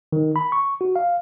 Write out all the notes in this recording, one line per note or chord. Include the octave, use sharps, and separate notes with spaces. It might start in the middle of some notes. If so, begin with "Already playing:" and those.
D#3
B5
C#6
F#4
F5